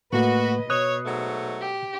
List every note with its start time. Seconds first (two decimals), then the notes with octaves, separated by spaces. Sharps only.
0.13 A2 A3 A#3 F#4 B4 D#5
0.70 B2 C#5 D#6 F#6
1.05 G#2 F#3 A3
1.61 G4